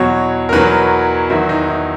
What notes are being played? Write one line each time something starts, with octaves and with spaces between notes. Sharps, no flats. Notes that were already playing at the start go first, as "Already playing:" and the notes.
Already playing: E2 B2 F#3 C#5
A#4
E2 B2 F#3 B4
E2 D#3 F#3 E4
D#4
E4